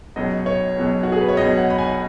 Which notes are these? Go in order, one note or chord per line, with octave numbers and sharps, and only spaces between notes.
C#2 B2 F#3 D#5
C#5
C#2 B2 F#3
F#4
G#4
B4
C#5
C#2 B2 F#3 D#5
F#5
B5
G#5